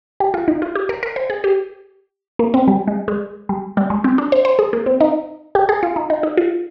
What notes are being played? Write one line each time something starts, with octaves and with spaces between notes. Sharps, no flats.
G4
F4
D#4
F4
G4
A#4
A#4
C5
G#4
G4
A#3
C4
G3
G#3
G#3
G3
G3
G#3
C4
D4
C5
C5
G#4
A#3
C4
D#4
G4
G#4
F4
D#4
D#4
D#4
F4